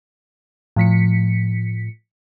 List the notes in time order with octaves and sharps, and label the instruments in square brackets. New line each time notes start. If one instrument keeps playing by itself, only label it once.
[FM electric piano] A2 F3 B6 C#7